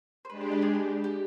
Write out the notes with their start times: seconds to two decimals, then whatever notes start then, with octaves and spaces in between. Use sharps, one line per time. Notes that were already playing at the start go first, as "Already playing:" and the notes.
0.25 C5
0.29 G#3 D4 G4 B4
0.41 C5
0.52 B4
0.62 G#4
0.75 B4
1.04 G4